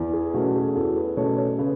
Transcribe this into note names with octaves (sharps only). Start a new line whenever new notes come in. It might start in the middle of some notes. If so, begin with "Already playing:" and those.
Already playing: E2
G#4
B2 A3 C#4 F#4
G#4
E2 F#4 A4
G#4 B4
B2 A3 C#4 A4 C#5
A4 C#5
C#3 G#4 B4